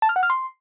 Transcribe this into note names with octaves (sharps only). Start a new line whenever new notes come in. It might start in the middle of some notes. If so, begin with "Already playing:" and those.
A5
F6
F#5
F6
C6